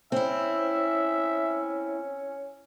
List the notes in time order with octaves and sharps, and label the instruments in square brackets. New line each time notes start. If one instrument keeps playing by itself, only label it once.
[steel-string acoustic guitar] C4 E4 [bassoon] C#4 [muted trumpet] E5